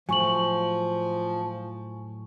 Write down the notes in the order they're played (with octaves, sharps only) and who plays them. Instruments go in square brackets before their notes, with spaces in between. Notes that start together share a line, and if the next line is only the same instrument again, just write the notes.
[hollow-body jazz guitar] A2 F#3 [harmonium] F3 [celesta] G#5 C#6 F#7